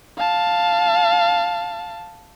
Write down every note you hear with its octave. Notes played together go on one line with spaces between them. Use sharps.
F5 A5